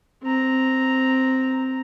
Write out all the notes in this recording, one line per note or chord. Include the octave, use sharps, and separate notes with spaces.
C4 A#5